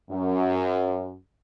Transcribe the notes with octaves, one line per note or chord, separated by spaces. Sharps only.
F#2